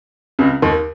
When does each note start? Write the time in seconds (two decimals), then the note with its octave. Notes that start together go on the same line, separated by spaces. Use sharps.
0.39 C#2 C#3
0.62 D#2 D#3